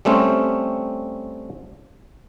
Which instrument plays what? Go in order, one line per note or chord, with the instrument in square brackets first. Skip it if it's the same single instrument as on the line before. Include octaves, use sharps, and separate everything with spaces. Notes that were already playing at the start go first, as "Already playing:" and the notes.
[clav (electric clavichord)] G3 A3 C4 C#4